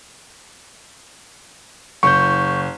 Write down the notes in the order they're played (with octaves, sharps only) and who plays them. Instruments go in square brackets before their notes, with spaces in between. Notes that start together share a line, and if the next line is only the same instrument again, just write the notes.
[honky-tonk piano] F#1 [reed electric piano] C#6 G6